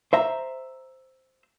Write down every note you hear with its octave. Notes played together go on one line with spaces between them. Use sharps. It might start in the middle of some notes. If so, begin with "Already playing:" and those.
C5 E5 A#5